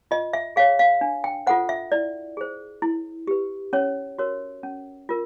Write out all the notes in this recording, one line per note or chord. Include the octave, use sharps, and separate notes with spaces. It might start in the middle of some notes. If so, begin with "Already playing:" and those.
F4 D#5
E5
G#4 C#5 F5
F5
D4
G5
F4 A4 C5 F#5
E5
E4 D5
G#4 C5
E4
G4 B4
C#4 C#5
F#4 A#4 C#5
C#4
F4 A#4